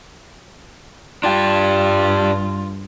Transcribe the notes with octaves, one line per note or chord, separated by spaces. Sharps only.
G2 D4 F4 G4